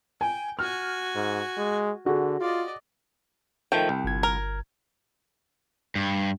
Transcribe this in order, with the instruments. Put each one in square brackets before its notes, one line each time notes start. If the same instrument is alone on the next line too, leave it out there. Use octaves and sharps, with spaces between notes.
[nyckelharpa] G5 [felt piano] G#5
[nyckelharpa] F#4 G#5 [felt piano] F6
[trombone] G#2
G#3
[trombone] D3 [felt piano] F#4 G#4
[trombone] F4 [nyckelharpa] D5 D#5
[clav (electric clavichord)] D#3 F3 A3 [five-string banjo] G5 [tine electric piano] G6
[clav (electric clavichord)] C2
[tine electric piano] G1 G#6
[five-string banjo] A#4
[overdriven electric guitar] G2